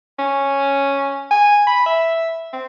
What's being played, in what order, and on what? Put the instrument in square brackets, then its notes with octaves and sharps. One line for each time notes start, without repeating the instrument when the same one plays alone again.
[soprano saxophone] C#4
G#5
B5
E5
C4